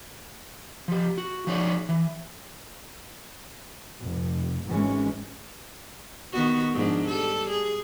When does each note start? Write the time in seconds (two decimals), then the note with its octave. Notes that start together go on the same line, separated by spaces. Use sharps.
0.88 F3 G4
1.18 F#4
1.47 F3 D#4 F#4 G#4 C#5 D5
1.89 E3
4.01 F1
4.66 G#1 E3 G#3 C#4
6.32 D#3 B3 F#4
6.74 G#2 F3 D4
7.07 G3 A4
7.50 G#4